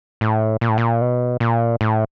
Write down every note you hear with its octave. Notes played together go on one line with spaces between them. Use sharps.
A2
A#2
A2
A#2
B2
A#2
A2